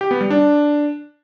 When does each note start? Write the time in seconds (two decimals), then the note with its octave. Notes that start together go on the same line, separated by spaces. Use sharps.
0.01 G4
0.11 B3
0.21 G3
0.30 D4